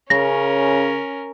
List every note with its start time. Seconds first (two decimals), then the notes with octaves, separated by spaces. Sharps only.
0.10 C#3 C#4 A#4 A#6